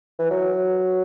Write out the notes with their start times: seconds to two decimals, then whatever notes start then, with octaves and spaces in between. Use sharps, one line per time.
0.19 E3
0.30 F#3